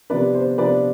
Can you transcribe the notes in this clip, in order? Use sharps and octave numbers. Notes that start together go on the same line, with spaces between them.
C3 F3 B3 D4 B4 D5
C5
C3 F3 B3 D4 B4 D5